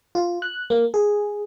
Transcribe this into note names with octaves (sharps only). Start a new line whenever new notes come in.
F4
F#6
A#3
G#4